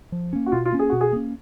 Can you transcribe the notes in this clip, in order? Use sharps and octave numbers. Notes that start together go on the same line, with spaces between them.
F3
A#3 C#4
F#4
B2 F4
F4
A#3 C#4
G#4
B2 F#4
G#4
A#3 C#4